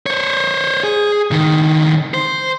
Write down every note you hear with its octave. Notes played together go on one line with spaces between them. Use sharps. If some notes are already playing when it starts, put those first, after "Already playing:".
C5 C#5
G#4
C#2 D#3
C5